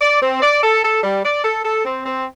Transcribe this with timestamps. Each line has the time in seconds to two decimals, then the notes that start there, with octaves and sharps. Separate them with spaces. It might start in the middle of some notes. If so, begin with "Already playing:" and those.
0.01 D5
0.22 C4
0.42 D5
0.63 A4
0.84 A4
1.03 G3
1.24 D5
1.44 A4
1.64 A4
1.85 C4
2.06 C4